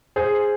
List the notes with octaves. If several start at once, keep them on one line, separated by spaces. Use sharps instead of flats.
G#4 C5